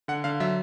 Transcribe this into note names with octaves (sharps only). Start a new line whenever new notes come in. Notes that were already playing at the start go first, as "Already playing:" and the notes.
D3 F#5
D3 F5
F#3 E5